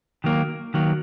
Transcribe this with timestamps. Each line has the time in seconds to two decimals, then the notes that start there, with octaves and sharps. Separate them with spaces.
0.24 D#3 F#3 A#3
0.74 D#3 F#3 A#3